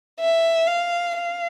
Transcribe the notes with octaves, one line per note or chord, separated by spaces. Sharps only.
E5
F5
F5